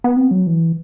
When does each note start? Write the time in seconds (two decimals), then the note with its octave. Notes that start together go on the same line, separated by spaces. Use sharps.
0.04 B3
0.16 C4
0.31 F#3
0.47 E3